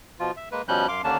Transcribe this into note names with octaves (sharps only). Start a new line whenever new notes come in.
B2 F3 F4
E5
G#3 A#3 B4
B2 F3 G3 C#4 F#6 G6
F#2 F5 C6 D6
D#2 D3 A#3 C#4 D4 A5